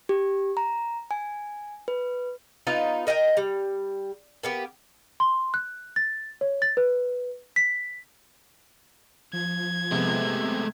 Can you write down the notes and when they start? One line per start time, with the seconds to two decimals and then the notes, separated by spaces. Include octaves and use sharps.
0.09 G4
0.57 A#5
1.11 G#5
1.88 B4
2.67 B3 D#4 F4
3.07 A#4 D#5 F#5 G5
3.37 G3
4.43 A#3 B3 G4
5.20 C6
5.54 F#6
5.96 A6
6.41 C#5
6.62 A6
6.77 B4
7.56 B6
9.33 F3 G#6
9.92 C3 G#3 A3 B3